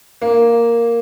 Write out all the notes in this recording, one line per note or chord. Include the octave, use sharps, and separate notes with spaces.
A#3